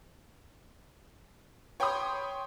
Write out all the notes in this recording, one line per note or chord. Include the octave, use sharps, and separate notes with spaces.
C#5 G5 B5 C6 D#6